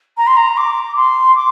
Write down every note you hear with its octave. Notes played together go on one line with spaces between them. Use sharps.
A#5
C6
A#5
D6
C6
D6